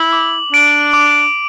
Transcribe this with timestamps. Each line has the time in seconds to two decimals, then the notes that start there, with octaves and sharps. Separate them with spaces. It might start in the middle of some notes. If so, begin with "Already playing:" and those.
Already playing: E4 F#7
0.13 D6
0.53 D4 D7
0.93 D6